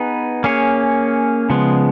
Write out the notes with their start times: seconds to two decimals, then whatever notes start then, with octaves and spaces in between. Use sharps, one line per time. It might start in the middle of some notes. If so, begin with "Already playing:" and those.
Already playing: B3 D#4 G#4 B4
0.44 A#3 C#4 G#4 C#5
1.50 C#3 F3 G#3 B3